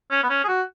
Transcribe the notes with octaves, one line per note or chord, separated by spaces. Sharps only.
C#4
B3
C#4
G#4
F#4